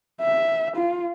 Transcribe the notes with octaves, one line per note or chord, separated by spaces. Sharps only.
E5
F4